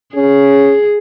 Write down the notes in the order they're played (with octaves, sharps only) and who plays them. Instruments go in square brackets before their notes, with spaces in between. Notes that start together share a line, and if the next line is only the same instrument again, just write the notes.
[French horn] C#4 [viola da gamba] G#4